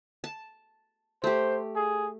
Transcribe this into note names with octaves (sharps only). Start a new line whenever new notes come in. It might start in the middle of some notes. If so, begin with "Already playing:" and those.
A5
A3 G4 C5
G#4